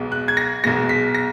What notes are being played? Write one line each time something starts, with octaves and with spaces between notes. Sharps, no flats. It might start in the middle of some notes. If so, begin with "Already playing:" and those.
Already playing: B1 B2 G#3
F#6
G#6
A#6
B1 B2 G#3 A#6
B6
A#6